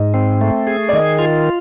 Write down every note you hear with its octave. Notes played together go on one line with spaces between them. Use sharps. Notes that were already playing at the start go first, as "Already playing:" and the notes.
Already playing: G#2 D#5
C4
A3
G#4
D5
D#3 D#5
F4